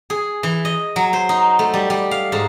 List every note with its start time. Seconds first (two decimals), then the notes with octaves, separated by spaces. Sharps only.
0.10 G#4
0.43 E3
0.65 D#5
0.96 F#3
1.13 C5
1.29 D#4
1.59 A3
1.74 G3
1.90 G3
2.11 F5
2.32 G#2